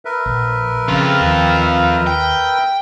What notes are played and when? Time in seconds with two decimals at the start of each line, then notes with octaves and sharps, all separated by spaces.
0.05 A#4 B4 E5
0.26 A#1
0.88 F2 C#3 F4
1.20 D#2
2.07 G5